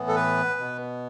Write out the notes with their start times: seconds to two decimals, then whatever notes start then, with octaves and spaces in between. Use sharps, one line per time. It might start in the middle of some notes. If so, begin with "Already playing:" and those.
Already playing: A2 E3 B3
0.08 A4
0.16 B4
0.60 B2 B3